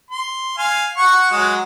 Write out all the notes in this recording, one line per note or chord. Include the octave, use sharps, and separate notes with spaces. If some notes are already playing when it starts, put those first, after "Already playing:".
C6
F5 G#5
F#5 C#6
F#3 G#3 F#4